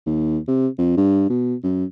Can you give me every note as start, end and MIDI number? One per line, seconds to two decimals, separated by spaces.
0.06 0.38 39
0.48 0.68 48
0.78 0.94 41
0.97 1.26 43
1.30 1.55 47
1.64 1.85 42